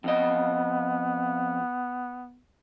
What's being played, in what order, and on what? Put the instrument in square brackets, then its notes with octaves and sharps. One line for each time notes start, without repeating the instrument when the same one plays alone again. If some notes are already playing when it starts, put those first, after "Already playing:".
[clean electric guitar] F2 D#5 [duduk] B3